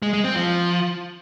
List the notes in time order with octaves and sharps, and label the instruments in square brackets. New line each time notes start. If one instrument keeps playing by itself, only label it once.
[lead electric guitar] G#3
G#3
C4
F3